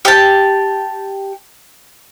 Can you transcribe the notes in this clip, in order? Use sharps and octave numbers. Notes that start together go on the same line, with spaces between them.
G4 A5